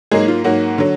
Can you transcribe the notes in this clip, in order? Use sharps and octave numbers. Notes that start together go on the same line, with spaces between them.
G#2 F#3 G#3 A#3 G#4
F4
G#2 F#3 A#3 F#4
D3 F#3